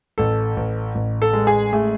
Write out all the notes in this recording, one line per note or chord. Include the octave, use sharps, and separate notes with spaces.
A1 A4
A1
A1
A4
G#3
G#4
A3 G#4